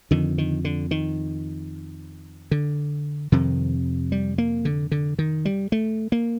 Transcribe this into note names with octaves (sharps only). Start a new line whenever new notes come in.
F2 D3 D#3
D#3
D3
D#3
D3
F2 C3 D#3
G3
A#3
D3
D3
D#3
G3
A3
A#3